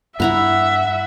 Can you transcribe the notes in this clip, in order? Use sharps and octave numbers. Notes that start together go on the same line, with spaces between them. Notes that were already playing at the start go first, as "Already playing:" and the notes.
G2 E4 E5 F#5 A#5 B5